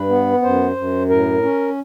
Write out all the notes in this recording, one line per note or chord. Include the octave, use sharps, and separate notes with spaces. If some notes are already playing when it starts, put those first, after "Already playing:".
Already playing: G2 B4
B3
F#2 C5
F#2
A2 A#4
C#4